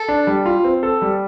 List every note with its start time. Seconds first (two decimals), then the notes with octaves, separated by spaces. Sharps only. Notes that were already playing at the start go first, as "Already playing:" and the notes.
Already playing: A4
0.08 D4
0.27 G3
0.46 F4
0.64 C4
0.83 A4
1.02 G3